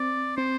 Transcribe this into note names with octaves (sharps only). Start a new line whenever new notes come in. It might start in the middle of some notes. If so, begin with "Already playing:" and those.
Already playing: C4 D5
C4 C5